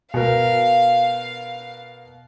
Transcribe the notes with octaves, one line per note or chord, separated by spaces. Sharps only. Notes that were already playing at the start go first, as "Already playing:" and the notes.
B2 A#4 F5